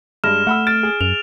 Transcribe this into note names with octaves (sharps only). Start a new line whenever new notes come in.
G2 G#3 F6 A#6 E7
A3 F#5 B5 E6
F6 A6 D7
G#4
F#2 F7